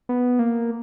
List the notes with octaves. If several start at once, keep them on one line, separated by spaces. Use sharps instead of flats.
B3
A#3